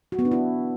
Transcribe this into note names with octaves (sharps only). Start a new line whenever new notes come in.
F#4
B3
D4
E4